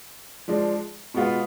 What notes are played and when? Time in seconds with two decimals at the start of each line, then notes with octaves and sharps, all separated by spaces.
0.48 F3 G#3 D4
1.14 B2 G#3 B3 F4